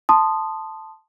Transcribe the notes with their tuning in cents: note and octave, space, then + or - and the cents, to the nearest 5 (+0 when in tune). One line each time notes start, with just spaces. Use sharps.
A5 +0 C6 -5 D#6 -15